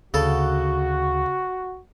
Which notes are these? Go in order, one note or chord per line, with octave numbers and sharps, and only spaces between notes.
D2 C#3 F#4 A4